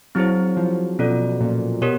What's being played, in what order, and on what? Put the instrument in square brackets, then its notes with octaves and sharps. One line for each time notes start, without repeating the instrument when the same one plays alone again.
[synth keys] F#3 [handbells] C4 E4 G#4 C5
[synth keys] F3
[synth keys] B2 [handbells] C#4 F4 A4 D5
[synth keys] A#2
[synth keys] B2 [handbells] G4 A#4 C#5